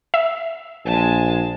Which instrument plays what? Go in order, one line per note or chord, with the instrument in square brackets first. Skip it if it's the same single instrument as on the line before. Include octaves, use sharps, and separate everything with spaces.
[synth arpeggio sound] E5
[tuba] A#1 [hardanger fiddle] G#3 A5